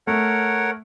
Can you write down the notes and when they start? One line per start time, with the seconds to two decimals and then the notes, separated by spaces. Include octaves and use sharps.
0.07 A3 A#4 C#5 F#5